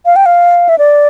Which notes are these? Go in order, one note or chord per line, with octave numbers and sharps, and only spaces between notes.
F5
G5
F5
E5
D5